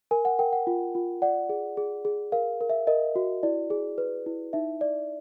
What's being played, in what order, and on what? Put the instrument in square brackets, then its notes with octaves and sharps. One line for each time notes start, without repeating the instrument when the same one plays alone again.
[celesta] A#4 G#5
F#5
A#4 G5
F#5
F4
F4
D5 F#5
G#4
G#4
G#4
A#4 F5
A#4
E5
A#4 D#5
F#4
E4 D5
G#4
B4
E4
D#4 E5
D5